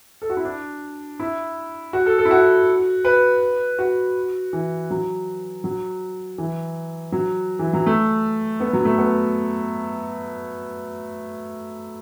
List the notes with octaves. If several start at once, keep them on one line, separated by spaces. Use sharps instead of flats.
A4
F#4
E4
D4
E4
F#4
A4
A4
E4
F#4
B4
F#4
E3
F#3
F#3
E3
F#3
E3
F#3
A3
B3
F#3
A3
B3